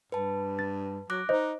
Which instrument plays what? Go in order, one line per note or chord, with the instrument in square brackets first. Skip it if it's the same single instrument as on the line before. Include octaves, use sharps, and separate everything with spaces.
[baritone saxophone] G2 [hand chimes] B4 A5
[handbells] A6
[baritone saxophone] F#3 [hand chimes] D6 F#6 A#6
[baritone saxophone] D#4 [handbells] C5 D#5